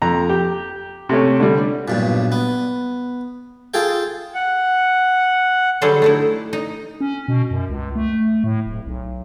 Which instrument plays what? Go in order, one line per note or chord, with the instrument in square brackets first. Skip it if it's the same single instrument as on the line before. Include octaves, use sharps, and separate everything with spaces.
[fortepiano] F2 A#5
G4
C3 A3 C#4
D3 G3
[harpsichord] B1 G2 A#2
B3
F4 G#4 A4 G5
[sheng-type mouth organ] F#5
[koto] D3 F#3 G3 G#4 A4 C5
A3 D#4 E4
D#4
[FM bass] C#4
B2
F#2
C#2
A3
A2
D1
B1